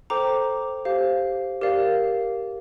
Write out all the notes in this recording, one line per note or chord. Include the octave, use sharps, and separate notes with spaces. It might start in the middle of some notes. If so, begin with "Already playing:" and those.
A4 C5 G5 A#5 D6
G4 C5 F5
G4 A#4 D5 F5